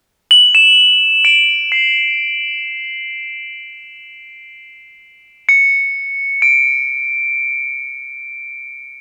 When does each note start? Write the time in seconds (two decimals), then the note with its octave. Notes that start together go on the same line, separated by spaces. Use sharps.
0.31 F#7
0.55 E7
1.25 D7
1.72 C7
5.49 C#7
6.42 D7